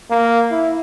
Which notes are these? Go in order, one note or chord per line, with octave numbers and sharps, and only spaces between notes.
A#3
E4